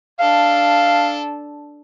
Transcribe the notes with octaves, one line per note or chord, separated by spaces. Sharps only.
D4 A4 F5